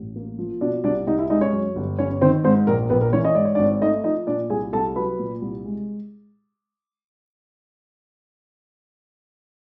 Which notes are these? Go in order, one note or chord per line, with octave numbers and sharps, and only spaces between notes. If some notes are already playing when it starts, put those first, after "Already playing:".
Already playing: A1
A#3
F3
B2 D4 D5
C2 D4 D5
C2 D#4 D#5
E4 E5
G#3 D#4 D#5
C#4 C#5
F#2
G1
G1 C#4 C#5
D#3 C4 C5
G#2 C4 C5
A#1 A#4
A#1 B3 B4
A#4
E3 C#4 C#5
D#5
G#2 D5
C#5
D4 D5
G#1
A3 D#4 D#5
F3 D#4 D#5
A#2 D4 D5
C2 G#4 G#5
C2 A4 A5
F#3 B4 B5
A#2
C2
G#3